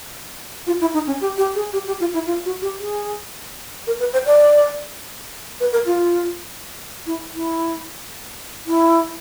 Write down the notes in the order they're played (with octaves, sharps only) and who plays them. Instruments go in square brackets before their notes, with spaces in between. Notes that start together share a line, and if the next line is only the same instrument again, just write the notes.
[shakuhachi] F4
E4
D#4
C#4
G4
G4
G#4
G4
G4
F4
E4
F4
F#4
G4
G#4
A#4
B4
C5
D5
B4
A#4
F4
E4
E4
E4